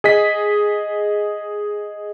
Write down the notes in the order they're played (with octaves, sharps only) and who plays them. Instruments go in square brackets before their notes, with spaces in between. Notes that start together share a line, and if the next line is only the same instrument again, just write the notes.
[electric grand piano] G#4 D#5 B6